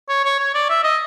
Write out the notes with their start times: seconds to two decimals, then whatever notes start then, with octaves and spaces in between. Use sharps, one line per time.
0.09 C#5
0.25 C#5
0.39 C#5
0.54 D5
0.70 E5
0.83 D#5